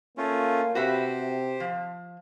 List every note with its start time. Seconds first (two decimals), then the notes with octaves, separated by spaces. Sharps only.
0.18 A3 A#3 C#4 F4
0.75 C3 F#4 G4 B4 C5 E5
1.60 F3